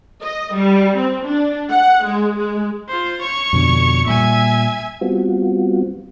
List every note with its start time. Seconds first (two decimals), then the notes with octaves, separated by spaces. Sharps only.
0.22 D#5
0.54 G3
0.96 C4
1.26 D4
1.70 F#5
2.04 G#3
2.38 G#3
2.89 F4 C5
3.21 C#5 C#6
3.53 F2 B2 D3
4.06 A#2 G3 E5 G#5
5.01 G3 B3 C4 F4 F#4